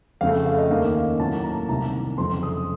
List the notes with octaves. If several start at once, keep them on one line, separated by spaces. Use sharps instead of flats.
F2 C#3 A3 F5
F5
D#5
D#2 D#3 A#3 C#4 F5
F5
A2 F#3 A#3 A5
A5
A#5
C2 C3 D#3 A#5
F2 C#3 F#3 A3 C6
D#6